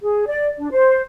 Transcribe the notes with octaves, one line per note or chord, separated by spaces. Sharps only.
G#4
D5
D4
C5